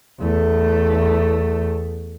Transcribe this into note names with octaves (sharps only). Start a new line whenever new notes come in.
E2 A3